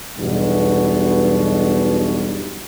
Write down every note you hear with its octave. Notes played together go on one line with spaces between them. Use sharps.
B1 E2 G2 B2